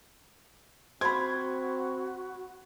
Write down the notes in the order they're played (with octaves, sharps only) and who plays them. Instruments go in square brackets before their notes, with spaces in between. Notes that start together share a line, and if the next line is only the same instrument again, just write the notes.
[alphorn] C4 [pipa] F4 C5 [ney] F#4 [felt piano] B5 G#6